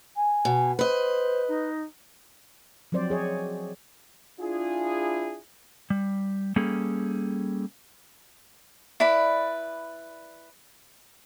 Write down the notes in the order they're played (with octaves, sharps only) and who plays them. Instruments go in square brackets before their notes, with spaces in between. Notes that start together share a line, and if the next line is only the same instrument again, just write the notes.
[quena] G#5
[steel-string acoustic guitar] B2
[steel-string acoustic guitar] B4 D#5 [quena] C5
[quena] D#4
[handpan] F3 F#3 C4 C5 D5
G#4 C#5 D#5
[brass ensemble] D4 E4 F4 G#4
[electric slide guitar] G3
G3 A#3 C#4 G#4 A4
[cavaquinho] E4 B4 D5 B5